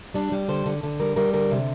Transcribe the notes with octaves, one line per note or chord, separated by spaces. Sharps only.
G3 D4
G3
D3 C5
D3
D3
G3 A#4
G3 A#4
D3 A#4
C3